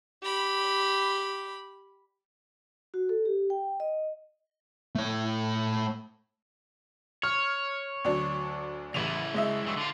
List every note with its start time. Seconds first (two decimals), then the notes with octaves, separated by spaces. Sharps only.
0.23 G4 B5
2.94 F#4
3.09 A4
3.25 G4
3.50 G5
3.80 D#5
4.95 A3 C#5
7.23 C#5 F6
8.05 D2 F#3 D4
8.94 A1 C#3 E4 D#7 F7
9.34 G#3 D#5 E5
9.65 G2 E3 F#3
9.77 D3 F4